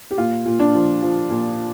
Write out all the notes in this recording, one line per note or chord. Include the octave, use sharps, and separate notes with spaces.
G4
A#2 F4
A#2
D4
F3
F3
A#2